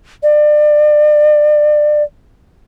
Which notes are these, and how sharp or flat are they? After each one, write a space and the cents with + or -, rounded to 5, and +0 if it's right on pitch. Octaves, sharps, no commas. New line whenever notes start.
D5 +30